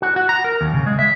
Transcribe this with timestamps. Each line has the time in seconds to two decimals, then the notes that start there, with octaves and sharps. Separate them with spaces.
0.02 F#4
0.16 F#4
0.29 A#5
0.44 A#4
0.61 D#2
0.74 C#3
0.86 G#3
0.99 E5